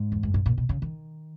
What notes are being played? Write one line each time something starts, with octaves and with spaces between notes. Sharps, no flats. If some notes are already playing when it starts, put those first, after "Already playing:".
Already playing: G#2
E2
F#2
G#2
A#2
B2
C#3
D#3